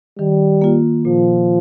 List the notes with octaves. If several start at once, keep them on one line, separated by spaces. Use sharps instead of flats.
D#3 G3
A#3 F4
A#2 F3